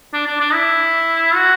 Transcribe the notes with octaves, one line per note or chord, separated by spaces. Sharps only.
D4
D4
D4
E4
F#4